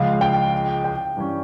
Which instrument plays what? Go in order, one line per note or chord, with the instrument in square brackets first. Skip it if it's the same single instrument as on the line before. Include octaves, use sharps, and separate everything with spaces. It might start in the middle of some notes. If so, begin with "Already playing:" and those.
Already playing: [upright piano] C#2 C#3 F3 G#3 [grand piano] F5
[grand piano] G5
G5
[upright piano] G2 E3 G3 C#4